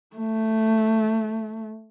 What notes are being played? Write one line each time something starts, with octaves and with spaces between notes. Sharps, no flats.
A3